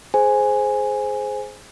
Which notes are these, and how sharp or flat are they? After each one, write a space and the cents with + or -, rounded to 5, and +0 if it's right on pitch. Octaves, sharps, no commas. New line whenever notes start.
G#4 +20 C5 +0 G#5 +0